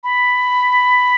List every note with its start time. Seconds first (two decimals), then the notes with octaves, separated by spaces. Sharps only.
0.04 B5